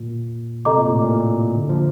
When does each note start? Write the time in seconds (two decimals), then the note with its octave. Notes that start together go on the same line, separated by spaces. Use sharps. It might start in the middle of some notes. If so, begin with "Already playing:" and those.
Already playing: A#2
0.65 C3 A4 D#5 A#5 D6
0.77 A#2
0.89 A2
1.02 A#2
1.55 D3
1.69 F3